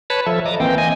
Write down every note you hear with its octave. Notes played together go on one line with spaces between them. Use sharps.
B4 C#5 A5 B5
F3 A4 E5
D#5 A#5 D6
E3 A#3 C4 G5
D#5 G#5